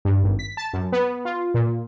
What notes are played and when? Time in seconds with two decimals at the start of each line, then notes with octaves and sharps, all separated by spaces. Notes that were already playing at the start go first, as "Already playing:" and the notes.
0.05 G2
0.24 G#1
0.39 B6
0.57 A5
0.73 F#2
0.92 B3
1.25 F4
1.54 A#2